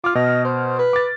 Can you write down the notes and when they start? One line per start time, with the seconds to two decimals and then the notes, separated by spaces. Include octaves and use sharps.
0.04 F4 D6 F6
0.15 B2 D#5
0.44 C5
0.79 B4
0.93 D6 A6